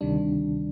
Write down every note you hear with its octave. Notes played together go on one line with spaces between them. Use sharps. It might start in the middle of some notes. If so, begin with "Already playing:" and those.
D2 C3 D#3 G3 D4